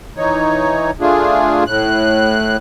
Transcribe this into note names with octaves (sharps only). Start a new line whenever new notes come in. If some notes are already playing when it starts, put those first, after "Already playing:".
E3 D#4 C#5
A3 D4 F4 G#4
A2 F#6